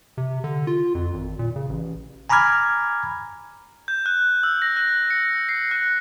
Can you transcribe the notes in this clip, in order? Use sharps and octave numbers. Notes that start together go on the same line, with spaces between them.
C3
D3
F4
F2
G#1
A#2
C#3
A1
G#5 A#5 B5 D6 F6 G#6
G6
F#6
E6
A#6
F#6
C#7
C7
F#6